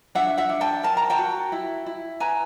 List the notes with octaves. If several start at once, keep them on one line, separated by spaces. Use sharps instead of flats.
D4 E5 F#5
E5 F#5
D4
G5 A5
A#4 A5
A#5
G5 A5
F#4
E4
E4
B4 G#5 A#5